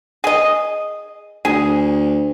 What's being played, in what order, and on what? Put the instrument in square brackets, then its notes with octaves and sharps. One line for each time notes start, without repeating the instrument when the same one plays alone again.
[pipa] G#4 D#5
[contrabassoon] D2 [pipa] G#4